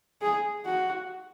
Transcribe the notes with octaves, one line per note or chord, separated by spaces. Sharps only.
G#4
F#4